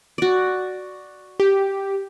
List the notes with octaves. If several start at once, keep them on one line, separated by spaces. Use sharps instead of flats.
F#4 D5
G4